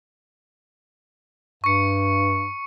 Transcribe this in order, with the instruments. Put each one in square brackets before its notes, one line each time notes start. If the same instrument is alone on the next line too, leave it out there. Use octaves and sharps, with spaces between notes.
[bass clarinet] G2 [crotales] C#6 C#7